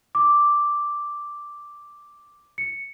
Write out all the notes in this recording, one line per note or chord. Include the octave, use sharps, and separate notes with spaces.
D6
C#7